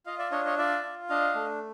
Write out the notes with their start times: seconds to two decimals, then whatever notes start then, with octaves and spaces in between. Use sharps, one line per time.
0.06 F4 D#5 F5
0.19 D5 E5
0.31 D4 C#5 D#5
0.45 C#5 D#5
0.58 F4 D5 E5
0.83 F4
1.09 D4 D#5 F5
1.35 A3